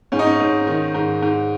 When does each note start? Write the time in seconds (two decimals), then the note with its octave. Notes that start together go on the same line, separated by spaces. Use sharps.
0.12 G#2 C#4
0.19 D#4
0.26 C#4
0.40 G#2
0.67 D#3
0.94 G#2
1.22 G#2